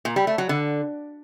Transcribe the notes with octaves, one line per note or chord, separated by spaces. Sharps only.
A#2
G3
A3
F#3
D3